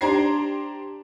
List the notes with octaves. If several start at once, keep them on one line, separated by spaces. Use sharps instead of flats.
D4 G4 C5 A#5 G#6 C7